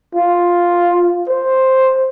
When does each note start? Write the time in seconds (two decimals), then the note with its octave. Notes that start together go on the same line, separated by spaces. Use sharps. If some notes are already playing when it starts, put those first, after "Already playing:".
0.15 F4
1.29 C5